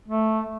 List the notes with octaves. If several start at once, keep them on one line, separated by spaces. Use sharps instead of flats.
A3